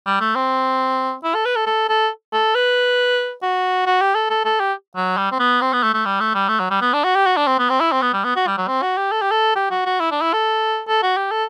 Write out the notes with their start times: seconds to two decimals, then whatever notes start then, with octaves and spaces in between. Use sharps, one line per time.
0.06 G3
0.21 A3
0.35 C4
1.24 E4
1.34 A4
1.45 B4
1.56 A4
1.67 A4
1.89 A4
2.33 A4
2.55 B4
3.42 F#4
3.86 F#4
4.01 G4
4.15 A4
4.30 A4
4.45 A4
4.60 G4
4.96 F#3
5.17 G3
5.32 C4
5.40 B3
5.61 C4
5.73 B3
5.84 A3
5.94 A3
6.05 G3
6.20 A3
6.35 G3
6.49 A3
6.60 F#3
6.71 G3
6.82 B3
6.94 D4
7.04 F#4
7.16 G4
7.26 F#4
7.37 D4
7.47 C4
7.59 B3
7.70 C4
7.80 E4
7.92 C4
8.02 B3
8.14 G3
8.24 B3
8.36 F#4
8.47 G3
8.57 F#3
8.68 C4
8.83 F#4
8.97 G4
9.12 A4
9.22 G4
9.31 A4
9.56 G4
9.71 F#4
9.86 F#4
10.00 E4
10.11 D4
10.22 E4
10.33 A4
10.88 A4
11.03 F#4
11.17 G4
11.31 A4